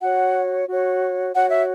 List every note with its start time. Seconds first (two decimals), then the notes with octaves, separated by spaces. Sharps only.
0.01 F#4 C#5 F#5
0.68 F#4 C#5
1.35 F#4 C#5 F#5
1.49 E5